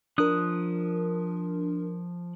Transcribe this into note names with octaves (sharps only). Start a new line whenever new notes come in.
F3 D4 A#4 D#6 F#6